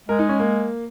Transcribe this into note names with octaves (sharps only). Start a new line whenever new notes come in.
G#3 A#4
D#4
C#4
A#3